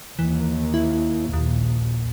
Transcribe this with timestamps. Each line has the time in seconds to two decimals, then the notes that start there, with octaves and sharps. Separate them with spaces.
0.19 D#2 E3
0.74 E4
1.33 A#1 D#2